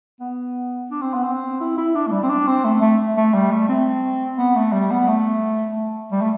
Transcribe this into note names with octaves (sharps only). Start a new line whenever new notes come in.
B3
D4
C4
B3
C4
E4
E4
D4
A3
G3
C4
D4
C4
A3
A3
A3
G3
A3
C4
B3
A3
G3
B3
A3
G3
A3